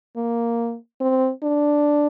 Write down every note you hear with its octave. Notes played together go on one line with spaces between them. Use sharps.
A#3
C4
D4